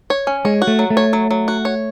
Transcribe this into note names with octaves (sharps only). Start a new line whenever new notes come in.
C#5
C#4
G#3 C#5
F#4
A3
F#3
A3
C#5
F#3
F#3
F#4
C#5